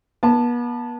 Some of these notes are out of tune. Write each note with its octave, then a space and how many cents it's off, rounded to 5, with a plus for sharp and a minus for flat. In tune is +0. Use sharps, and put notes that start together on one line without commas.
B3 -40 A5 +0